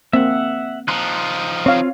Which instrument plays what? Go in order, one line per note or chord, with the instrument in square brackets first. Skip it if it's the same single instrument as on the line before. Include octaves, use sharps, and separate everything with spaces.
[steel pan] A#3 C4 [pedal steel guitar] E5 F#5
[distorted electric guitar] F3 D#4 [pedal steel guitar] C6 F#6
[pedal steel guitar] C4 F4 [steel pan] C#5 F5